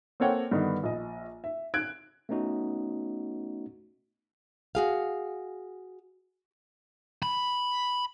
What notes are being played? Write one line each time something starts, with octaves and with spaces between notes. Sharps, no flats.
A#3 C4 A4 C#5 F#5 G5
G2 D3 D#3 B3 D#4
A#1 D#5
E5
F#6 G#6 D7
A3 B3 C#4 D#4 F#4
F#4 G#4 F5
B5